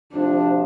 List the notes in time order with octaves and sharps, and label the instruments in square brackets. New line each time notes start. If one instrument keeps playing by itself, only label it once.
[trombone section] D2 C3 F3 [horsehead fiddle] D4